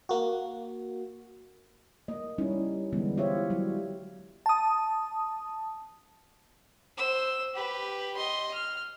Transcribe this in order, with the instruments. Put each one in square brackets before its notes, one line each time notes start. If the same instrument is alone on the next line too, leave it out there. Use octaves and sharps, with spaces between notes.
[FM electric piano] A#3 F#4
[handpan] A#3 D#5
G3 C#4 D#4 E4
D3 E3 G3 G#3 B3
E4 F4 G4 C5 C#5 E5
F#3 G3 E4
[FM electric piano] A5 D#6
[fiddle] C5 E6
G4 B4
D#5 C6
F6